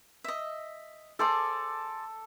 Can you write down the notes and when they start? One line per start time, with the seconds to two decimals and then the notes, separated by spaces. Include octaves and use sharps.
0.24 D#5 E5
1.19 G#4 A4 C5 D5 D6